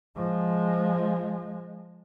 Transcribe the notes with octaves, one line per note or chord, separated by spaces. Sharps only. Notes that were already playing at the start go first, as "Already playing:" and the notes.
F3 G#3